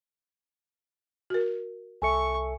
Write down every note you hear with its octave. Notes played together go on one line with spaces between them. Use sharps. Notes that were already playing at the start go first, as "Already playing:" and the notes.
F#4 A#4
C2 A4 E5 G#5 C#6 C#7